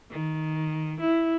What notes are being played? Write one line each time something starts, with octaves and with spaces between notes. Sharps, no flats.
D#3
E4